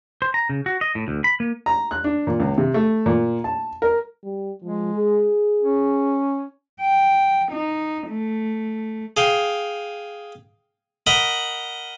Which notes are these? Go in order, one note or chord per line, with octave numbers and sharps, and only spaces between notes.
C5
A#5
C#3
F#4
D#5
A2
D2
B5
A#3
A#5
F#6
D4
A#2
C#2
C3
A3
A#2
A5
A#4
G3
F3 G#3
G#4
C#4
G5
D#4
A3
G#4 F5 G5
A#4 D#5 F#5 B5